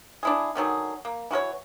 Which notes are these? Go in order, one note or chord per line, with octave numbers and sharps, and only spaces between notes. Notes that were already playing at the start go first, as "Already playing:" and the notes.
D4 E4 G#4
D3 D#3 F#3 G#4
A#3
E3 F#4 A#4 C#5